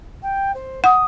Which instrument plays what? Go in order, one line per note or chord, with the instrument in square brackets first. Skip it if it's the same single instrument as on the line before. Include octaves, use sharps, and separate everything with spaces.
[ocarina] G5
C5
[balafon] F#5 [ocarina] D#6